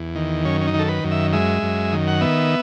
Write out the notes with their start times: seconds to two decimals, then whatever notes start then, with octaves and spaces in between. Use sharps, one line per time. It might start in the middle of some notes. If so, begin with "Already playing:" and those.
Already playing: E2
0.15 D#3
0.45 F#2 C#4
0.61 C#4
0.67 D#4
0.74 D#3
0.79 A4
0.89 B4
1.04 F#2
1.11 E5
1.33 G#3 E5
1.62 F#2
1.92 D#3
2.08 F#5
2.21 B3 E5